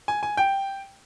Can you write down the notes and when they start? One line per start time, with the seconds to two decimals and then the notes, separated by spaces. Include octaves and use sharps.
0.08 G#5
0.23 G#5
0.37 G5